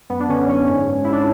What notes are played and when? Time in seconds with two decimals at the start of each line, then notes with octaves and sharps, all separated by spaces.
0.10 F#2 B3
0.20 D4
0.29 D3 C#4
0.49 F#2 C#4
0.68 G#2
0.89 G#2
1.04 E4
1.08 G#2 D4